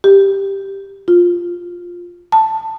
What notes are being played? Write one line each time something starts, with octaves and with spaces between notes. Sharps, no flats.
G4
F4
A5